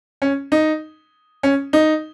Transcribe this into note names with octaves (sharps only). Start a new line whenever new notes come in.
C#4
D#4
C#4
D#4